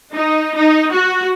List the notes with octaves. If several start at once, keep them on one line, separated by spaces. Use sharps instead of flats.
D#4
D#4
F#4